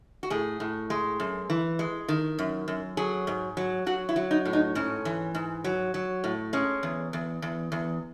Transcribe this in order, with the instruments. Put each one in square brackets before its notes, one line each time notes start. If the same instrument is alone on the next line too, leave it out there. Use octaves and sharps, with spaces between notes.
[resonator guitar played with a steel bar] F#4
A2 G#4
A2
G#3
F#2
E3
G#3
D#3
F#2
F#2
F#3 G#4
G#2
F#3
F#3 F#4
E4
F#3
D#4
A2
D#4
G#2 C#4
E3
G#2
F#3
F#3
A2
G#3 C#4
E2
E2
E2
E2